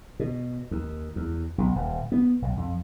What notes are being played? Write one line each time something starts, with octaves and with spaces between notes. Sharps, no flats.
B2
D#2
E2
B1
D#1
B3
B1
F2